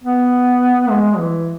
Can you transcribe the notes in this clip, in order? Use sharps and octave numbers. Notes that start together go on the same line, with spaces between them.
B3
G#3
E3